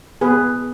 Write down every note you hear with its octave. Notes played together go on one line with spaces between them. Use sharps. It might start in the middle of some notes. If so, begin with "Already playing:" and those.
B3 G#4 B4